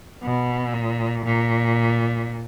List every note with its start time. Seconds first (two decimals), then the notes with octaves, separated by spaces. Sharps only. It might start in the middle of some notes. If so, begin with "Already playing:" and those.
0.24 B2
0.74 A#2
1.25 A#2